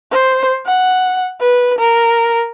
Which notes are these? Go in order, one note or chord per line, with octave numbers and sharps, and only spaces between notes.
C5
F#5
B4
A#4